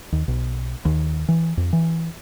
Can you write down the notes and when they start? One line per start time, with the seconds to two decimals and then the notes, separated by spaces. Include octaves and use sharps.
0.12 D#2
0.28 B1
0.85 D#2
1.28 E3
1.57 F2
1.73 E3